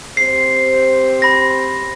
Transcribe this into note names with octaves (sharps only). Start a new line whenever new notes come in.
C4 G4 C5 C7
B5 A#6